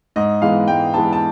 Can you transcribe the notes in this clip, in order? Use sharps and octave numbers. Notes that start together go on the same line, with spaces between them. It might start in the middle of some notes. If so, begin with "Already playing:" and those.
G#2 D#5
E3 G#3 B3 F5
G#2 G5
E3 G#3 B3 A5
A5